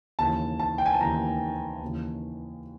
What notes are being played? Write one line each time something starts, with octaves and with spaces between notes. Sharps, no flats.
D#2 C#3 E3 A5
A5
G5
G#5
A5
D#2 C#3 E3 A#5
D#2 C#3 E3